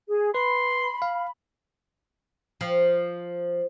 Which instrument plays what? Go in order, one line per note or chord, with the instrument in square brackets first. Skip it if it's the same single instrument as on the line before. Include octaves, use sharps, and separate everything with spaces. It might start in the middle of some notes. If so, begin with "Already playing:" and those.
[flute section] G#4
[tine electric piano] B4 [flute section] B5 [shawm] C6
[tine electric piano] F5
[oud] F3